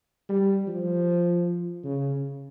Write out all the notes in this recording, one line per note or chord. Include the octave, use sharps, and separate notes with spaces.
G3
F3
C#3